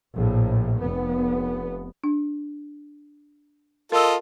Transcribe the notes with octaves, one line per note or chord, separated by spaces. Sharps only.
A#1 A2
F1 B3
D4
F4 A4 A#4 D#5 E6